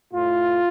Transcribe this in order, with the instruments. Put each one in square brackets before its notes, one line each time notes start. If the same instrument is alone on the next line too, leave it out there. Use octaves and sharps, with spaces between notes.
[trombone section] A2 F4